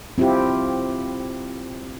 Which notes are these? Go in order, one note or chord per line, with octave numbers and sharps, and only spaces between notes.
C4 E4 F4 G4